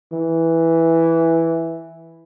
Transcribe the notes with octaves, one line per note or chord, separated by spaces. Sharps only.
E3